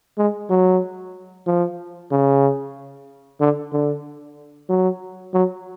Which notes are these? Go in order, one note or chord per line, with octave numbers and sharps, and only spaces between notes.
G#3
F#3
F3
C#3
D3
D3
F#3
F#3